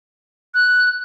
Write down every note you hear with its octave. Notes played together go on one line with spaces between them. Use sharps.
F#6